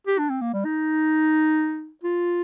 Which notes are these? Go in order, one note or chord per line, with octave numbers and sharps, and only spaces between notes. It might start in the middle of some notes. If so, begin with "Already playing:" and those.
G4
D4
C4
A#3
G3
D#4
F4